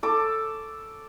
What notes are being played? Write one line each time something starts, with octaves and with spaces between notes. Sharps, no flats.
A4 D6